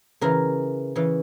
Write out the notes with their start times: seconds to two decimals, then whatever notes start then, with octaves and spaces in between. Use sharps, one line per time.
0.21 C#3 E3 A#4
0.96 C#3 E3